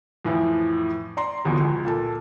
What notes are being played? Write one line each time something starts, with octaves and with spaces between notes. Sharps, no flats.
F2 A2 E3 F3
D5 A#5 C6
G1 E2 B2 F3
C#2
A#2 A4 A5